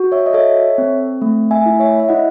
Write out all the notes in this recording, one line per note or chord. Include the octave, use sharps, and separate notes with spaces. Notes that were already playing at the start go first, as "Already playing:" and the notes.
Already playing: F#4
C#5 E5
D#5
A4 C#5 E5
C4
A3
E5 G#5
E4
C#5 E5
E5
E4 D#5 F#5